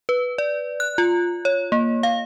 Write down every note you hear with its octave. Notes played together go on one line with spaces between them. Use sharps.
B4
D5
F#6
F4
C#5
A#3
F5